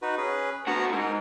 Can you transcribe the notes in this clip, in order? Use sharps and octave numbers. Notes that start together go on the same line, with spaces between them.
D#4 F#4 B4
C#4 G#4 B4
D3 B3 F#4 A5 A#5
G#2 A#4